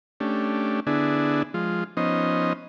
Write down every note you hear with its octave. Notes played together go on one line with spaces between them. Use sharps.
A3 C#4 D4 G4
D3 B3 D4 E4 G#4
F3 G#3 F4
F3 B3 C#4 D#4 C5 D#5